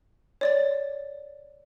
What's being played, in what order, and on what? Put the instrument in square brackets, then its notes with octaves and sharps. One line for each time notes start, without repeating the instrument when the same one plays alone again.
[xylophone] C#5 D5 A6